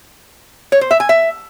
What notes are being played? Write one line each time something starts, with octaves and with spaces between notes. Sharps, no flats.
C#5
C5
E5
G#5
E5